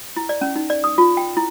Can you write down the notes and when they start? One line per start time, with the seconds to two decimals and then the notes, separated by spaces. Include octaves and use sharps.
0.17 E4
0.29 D5
0.41 C#4
0.56 D#4
0.70 D5
0.84 D#6
0.98 F4
1.17 G5
1.37 E4